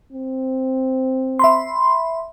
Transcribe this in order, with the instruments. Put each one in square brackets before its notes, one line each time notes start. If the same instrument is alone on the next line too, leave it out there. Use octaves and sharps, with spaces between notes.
[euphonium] C4
[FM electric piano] E5 B5 C6